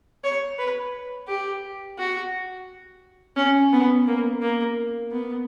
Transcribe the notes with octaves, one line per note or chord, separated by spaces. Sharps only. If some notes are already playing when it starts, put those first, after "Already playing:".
C#5
B4
G4
F#4
C#4
B3
A#3
A#3
B3